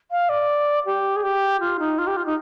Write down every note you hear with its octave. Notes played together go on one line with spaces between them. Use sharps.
F5
D5
G4
G#4
G4
F4
D#4
F4
G4
F4
D#4